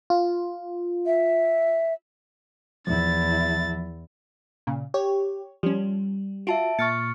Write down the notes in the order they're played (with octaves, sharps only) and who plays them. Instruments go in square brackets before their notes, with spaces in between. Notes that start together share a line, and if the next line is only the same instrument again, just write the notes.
[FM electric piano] F4
[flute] E5
[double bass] E2 E4 [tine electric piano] F3 [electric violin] A6
[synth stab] A#2 C#3
[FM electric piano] G4 [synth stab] C#5
[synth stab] F3 C#4 [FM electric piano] G3
[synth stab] F4 F#4 [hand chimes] E5 A5 D7
[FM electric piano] A#2 [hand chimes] C#6 F6 C#7 [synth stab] A6